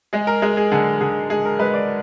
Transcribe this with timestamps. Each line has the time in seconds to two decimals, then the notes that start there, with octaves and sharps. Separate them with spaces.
0.13 G#3 G#4
0.27 A#4
0.42 G#3 G#4
0.57 G#4
0.72 D3 G#4
1.01 D3 G#4
1.30 G#3 G#4
1.45 A#4
1.59 G#3 B4
1.74 D5